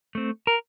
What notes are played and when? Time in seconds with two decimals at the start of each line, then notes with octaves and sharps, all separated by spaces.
0.15 A3 C4
0.47 A#4